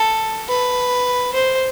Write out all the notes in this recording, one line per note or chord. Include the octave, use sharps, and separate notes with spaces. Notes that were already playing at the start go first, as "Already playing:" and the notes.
Already playing: A4
B4
C5